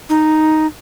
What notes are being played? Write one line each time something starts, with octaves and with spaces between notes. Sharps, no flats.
D#4